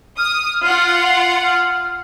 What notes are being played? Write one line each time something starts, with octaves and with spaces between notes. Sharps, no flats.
D#6 F6
F4 F#5
F6